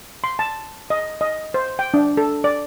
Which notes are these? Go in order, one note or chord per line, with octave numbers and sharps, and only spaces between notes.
C6
A5
D#5
D#5
C5
G5
D4
A4
D5